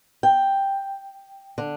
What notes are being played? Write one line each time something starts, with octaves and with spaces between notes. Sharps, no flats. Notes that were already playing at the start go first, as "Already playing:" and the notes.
G5
D3